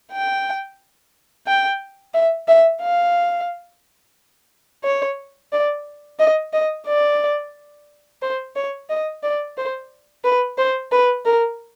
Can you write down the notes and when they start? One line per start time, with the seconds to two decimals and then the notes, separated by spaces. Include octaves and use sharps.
0.12 G5
1.47 G5
2.14 E5
2.48 E5
2.82 F5
4.84 C#5
5.53 D5
6.20 D#5
6.53 D#5
6.87 D5
8.22 C5
8.56 C#5
8.90 D#5
9.23 D5
9.58 C5
10.25 B4
10.58 C5
10.92 B4
11.26 A#4